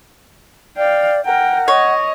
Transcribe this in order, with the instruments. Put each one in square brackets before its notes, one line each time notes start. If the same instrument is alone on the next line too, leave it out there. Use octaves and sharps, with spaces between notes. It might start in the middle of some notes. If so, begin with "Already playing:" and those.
[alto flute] D5 [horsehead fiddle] F5 G5
[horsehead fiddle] A#4 G5 [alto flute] F#5
[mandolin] C#5 [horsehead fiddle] D#5